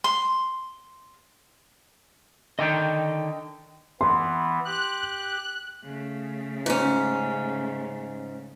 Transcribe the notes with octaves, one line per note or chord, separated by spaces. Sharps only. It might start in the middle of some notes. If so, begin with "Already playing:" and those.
C6
D3 D#3 D#5 G5 G6
E3 B3 C6
G4 F#6
C#3 A3
G#2 C#4